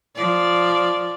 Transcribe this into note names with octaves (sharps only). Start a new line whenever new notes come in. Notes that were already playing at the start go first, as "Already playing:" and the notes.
F3 D5